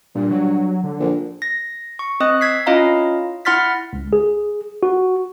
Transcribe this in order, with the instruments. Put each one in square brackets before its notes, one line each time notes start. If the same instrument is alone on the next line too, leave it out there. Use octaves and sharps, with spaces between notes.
[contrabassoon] G2 [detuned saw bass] A#2
[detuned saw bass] F#3
D3
[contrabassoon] A#1
[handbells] A#6
C#6
C4 D#5 D#6 F#6
E6 G#6 B6 C7
C#4 E4 F4 D#5 F5 A#5
E4 F#5 C6 F6 A6 B6
[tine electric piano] C#2
G#4
F#4